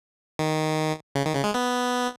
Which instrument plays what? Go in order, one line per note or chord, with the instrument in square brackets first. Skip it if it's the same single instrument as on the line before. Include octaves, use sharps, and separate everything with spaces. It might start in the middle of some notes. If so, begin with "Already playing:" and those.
[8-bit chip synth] D#3
C#3
D#3
C#3
G#3
B3